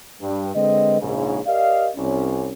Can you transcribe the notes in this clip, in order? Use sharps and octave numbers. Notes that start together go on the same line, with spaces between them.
G2
D3 G#3 C4 B4 D#5
A#1 G#2 C#3
G4 A#4 D5 D#5 F5
C2 C#4